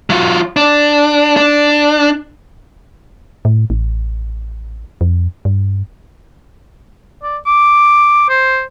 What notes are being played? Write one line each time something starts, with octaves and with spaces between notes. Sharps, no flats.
F#3 F4
D4
D4
A2
A1
F2
G2
D5
D6
C5